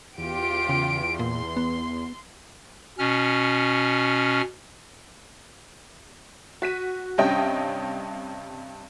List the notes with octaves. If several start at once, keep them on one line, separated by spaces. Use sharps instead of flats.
E2 F4 G4 D7
C#3
A#2 C6
B3
B2 C#4 F6
F#4 B6 D#7
G2 C3 C#4 D#5 E5 G5